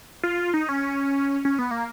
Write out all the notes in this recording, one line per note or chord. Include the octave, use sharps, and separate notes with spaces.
F4
D#4
C#4
C#4
B3
A#3